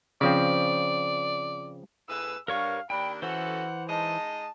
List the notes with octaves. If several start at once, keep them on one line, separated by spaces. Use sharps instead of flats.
C#3 F3 C4 D5
A2 G#4 B4 E6
G2 A#4 C#5 F5 C#6
D#2 D4 G5 B5
E3 C#4 F#4 A4 C5 F#5
G#3 D#4 D#5 A5